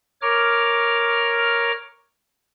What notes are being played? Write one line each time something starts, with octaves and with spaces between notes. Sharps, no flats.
A#4 C#5 D6 F6